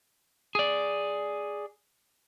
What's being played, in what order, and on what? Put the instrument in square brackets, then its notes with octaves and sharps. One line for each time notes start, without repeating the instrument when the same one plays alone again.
[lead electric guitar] G#4 D5